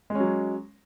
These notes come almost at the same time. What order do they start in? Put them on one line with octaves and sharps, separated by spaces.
G#3 C#4 F#3